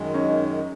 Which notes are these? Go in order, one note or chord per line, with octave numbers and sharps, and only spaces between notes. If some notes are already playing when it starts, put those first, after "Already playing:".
Already playing: F#2 D#3 G#3
C#4 D#4